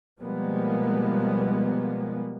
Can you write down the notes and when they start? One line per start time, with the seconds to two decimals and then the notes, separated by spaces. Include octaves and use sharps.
0.19 B2 F3 G3 G#3 A#3 B3